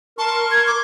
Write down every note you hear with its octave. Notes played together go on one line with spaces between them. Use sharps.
A#4 A5 C6 C#6
G#6
D6